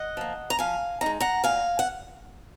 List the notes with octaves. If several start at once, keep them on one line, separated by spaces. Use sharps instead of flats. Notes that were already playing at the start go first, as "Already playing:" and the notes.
Already playing: D#5 F#5
F3 A#3
A#5
F3 F5 G#5
G#3 D#4 A#5
F#5 A#5
A#2 F5 G#5
F#5